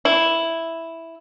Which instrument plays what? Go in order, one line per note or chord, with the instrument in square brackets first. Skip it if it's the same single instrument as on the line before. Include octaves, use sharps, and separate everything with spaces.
[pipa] E4